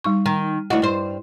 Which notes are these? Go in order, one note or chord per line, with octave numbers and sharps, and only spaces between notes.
G3 D#4 C#6
D#3
D2 E4 F#4 D#5
G2 C5